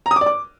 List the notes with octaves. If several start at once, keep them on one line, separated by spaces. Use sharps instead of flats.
A#5
D#6
D6
D5
D6